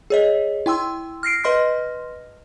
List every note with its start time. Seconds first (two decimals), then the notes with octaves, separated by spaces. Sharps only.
0.10 G#4 C#5 D#5
0.66 E4 G5 C6 E6
1.23 F6 A#6 C7 D7
1.44 B4 D#5 C6 F6 A#6